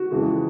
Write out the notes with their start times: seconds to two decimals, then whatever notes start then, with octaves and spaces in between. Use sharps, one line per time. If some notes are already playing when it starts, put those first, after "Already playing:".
Already playing: F#4
0.11 F2 C#3 E3 G#3